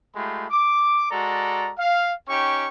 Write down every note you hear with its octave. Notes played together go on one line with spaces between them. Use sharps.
G#3 A3 F4 G4 B5
D6
G#3 F#4 A4 D5 A#5
F5
C#4 D#4 G4 G5 C#6